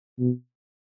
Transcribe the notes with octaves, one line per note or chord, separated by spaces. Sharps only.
B2